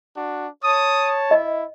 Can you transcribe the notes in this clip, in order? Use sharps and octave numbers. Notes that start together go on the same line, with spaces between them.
D4 F#4
C#5 A5 D#6
E4 D#5